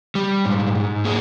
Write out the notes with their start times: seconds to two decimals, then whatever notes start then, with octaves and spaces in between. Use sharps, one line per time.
0.15 G3
0.45 G#2
0.75 G#2
1.05 A#3 G#4